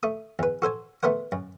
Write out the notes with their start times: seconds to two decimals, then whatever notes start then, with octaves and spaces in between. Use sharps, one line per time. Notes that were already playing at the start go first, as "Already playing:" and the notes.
0.03 A3 D#6
0.39 E2 B4
0.62 F#4 A4 C5 G#5
1.03 A3 B3 A#4 C5 F#5
1.32 F#2